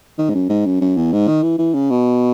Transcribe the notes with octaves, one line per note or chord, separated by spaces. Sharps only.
D#3
G#2
F#2
G#2
F#2
F#2
E2
G#2
D#3
E3
E3
C#3
B2